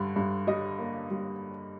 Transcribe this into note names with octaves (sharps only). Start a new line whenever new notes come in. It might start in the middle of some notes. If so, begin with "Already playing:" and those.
Already playing: G2 D3
G2
G3 D#5
A#3
G3